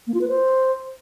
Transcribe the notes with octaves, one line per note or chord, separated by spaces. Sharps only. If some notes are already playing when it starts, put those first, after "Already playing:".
A#3
F4
B4
C5